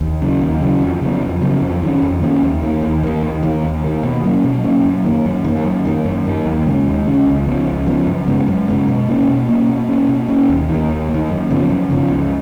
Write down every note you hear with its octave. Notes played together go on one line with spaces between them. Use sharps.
D#2
C#3 F#3
D#2
C#3 F#3
F2
C#3 F#3 B3
F2
C#3 F#3 B3
F2
D#3 A#3 C#4
F2
D#3 A#3 C#4
D#2
D#3 A#3
D#2
D#3 A#3
D#2
D#3 A#3
D#2
D#3 A#3
B2
F#3 A#3 C#4
B2
F#3 A#3 C#4
F#2
D#3 A#3
F#2
D#3 A#3
F#2
D#3 A#3
F#2
D#3 A#3
D#2
C#3 G#3 C#4
D#2
C#3 G#3 C#4
C#2
C#3 F3 B3
C#2
C#3 F3 B3
F#2
C#3 G#3 B3
F#2
C#3 G#3 B3
B2
A#3 C#4
B2
A#3 C#4
B2
A#3 C#4
B2
A#3 C#4
D#2
D#3
A#3
D#2
A#3
D#3
F#2
C#3 F3 B3
F#2
C#3 F3 B3
C#2